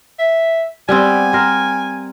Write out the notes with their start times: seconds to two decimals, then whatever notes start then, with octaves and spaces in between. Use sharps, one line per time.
0.19 E5
0.89 G3 B3 C4 G#5
1.33 A#4 C5